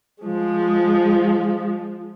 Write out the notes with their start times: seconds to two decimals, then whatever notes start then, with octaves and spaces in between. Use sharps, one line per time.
0.23 F3 G#3